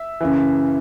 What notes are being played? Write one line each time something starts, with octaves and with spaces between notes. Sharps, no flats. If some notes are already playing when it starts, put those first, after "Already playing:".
Already playing: E5
F#2 C#3 E3